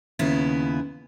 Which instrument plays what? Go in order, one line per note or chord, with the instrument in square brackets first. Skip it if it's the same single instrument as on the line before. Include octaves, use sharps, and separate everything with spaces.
[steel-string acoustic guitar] D#2 C#3 B3 E4